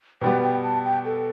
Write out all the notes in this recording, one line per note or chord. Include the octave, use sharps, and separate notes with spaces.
B2 G3 B3 G5
G5
A5
G5
A4